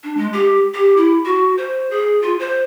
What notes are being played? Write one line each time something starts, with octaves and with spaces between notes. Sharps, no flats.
D4
G#3
G4
G4
E4
F#4
C5
G#4
F4
C5